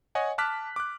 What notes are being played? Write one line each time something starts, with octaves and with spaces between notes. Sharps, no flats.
C#5 D#5 F#5 G#5
A5 D6 F6 F#6 B6
D6 F#6